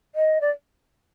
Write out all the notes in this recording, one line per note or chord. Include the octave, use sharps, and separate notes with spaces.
D#5
D5